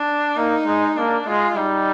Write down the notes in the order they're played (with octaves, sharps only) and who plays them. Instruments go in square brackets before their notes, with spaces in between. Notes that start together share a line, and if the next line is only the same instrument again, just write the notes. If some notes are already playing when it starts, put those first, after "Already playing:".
Already playing: [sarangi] D4
[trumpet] A#3 [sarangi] D#4
[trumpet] G#3
[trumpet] A#3 [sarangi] D4
[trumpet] G#3 [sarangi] F4
[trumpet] G3 [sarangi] D#4